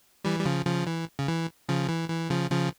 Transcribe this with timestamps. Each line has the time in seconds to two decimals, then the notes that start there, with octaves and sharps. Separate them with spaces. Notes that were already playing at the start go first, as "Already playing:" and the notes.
0.24 E3 G3
0.40 G3
0.45 C#3 F3
0.66 C#3 F3
0.87 E3
1.19 C#3
1.28 E3
1.69 C#3 F3
1.89 E3
2.10 E3
2.30 C#3 F3
2.51 C#3 F3